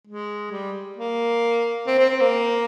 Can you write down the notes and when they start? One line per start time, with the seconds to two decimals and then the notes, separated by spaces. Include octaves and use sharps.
0.07 G#3
0.51 G3
0.97 A#3
1.87 C4
1.98 C4
2.10 C4
2.21 A#3